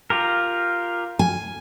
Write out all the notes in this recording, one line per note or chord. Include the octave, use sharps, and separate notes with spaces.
F4 G4 A#4
G#5